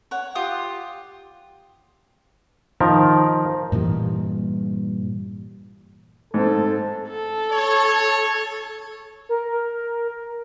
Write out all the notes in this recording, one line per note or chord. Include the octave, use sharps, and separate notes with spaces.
C#5 F#5
F4 G4 D#6
D#3 F3 A#4
G2 A#2 E3 G3
G#2 C4 A4
A4
C#5
A#4